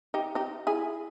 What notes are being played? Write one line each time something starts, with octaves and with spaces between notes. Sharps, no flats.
D#4 G4
D#4 G4
E4 G#4